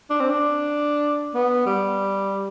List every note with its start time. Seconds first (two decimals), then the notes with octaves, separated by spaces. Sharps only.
0.10 D4
0.20 C4
0.30 D4
1.34 B3
1.66 G3